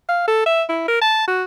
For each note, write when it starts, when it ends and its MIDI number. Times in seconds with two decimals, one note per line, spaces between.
0.09 0.24 77
0.28 0.43 69
0.46 0.63 76
0.69 0.86 64
0.88 1.00 70
1.02 1.27 81
1.27 1.44 66